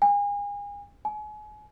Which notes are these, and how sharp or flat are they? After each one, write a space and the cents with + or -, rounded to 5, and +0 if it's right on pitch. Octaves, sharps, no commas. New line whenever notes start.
G#5 -35
G#5 +35